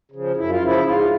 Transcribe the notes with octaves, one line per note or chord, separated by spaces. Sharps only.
C#3 F3
F#2 E4
F4
C#3 F3 E4
G#2 F4